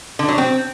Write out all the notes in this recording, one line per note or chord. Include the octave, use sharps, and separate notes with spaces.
D3
F#3
C4